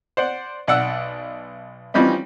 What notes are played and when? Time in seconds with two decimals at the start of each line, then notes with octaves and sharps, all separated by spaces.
0.17 C5 D5 F#5
0.67 B1 D5 F#5 E6
1.94 E3 F3 G3 C4 C#4 D#4